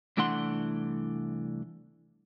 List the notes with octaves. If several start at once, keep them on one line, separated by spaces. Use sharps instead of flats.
C2 E3 A3 D4 F#5 C6